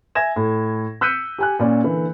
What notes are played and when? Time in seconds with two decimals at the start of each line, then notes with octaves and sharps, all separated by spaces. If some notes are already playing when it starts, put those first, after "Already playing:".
0.15 E5 G#5 G#6 A#6 E7
0.36 A2
1.01 E6 F#6 G6 B6 C#7 D#7
1.39 G4 G#5 F#6
1.59 A#2 C#4 D5
1.84 D3 E3 A#3